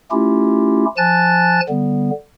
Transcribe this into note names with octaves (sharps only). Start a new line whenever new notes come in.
A3 C#4 E4 F4 G4
F3 G#5 A5 F#6 A6
D3 G3 B3